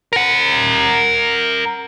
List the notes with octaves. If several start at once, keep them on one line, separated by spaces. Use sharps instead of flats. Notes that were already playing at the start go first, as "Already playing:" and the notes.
A#4 F#5